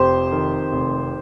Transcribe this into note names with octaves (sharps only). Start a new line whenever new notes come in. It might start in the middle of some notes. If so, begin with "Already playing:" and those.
Already playing: F1 F2 G4 C5
D#3
F1